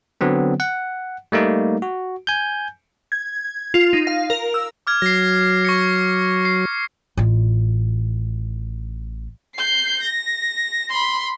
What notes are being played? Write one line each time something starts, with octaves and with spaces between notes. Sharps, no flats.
D3 F#3 B3 C4
F#5
G3 A3 A#3 D#4
F#4
G#5 G6
G#6
F4
D#4
F5
A#4
E6
D6 F6 G#6
F#3 A#6 C7
C#6 A#6 C#7
C7
A1 F4
G6 C7
A#6
B5 C6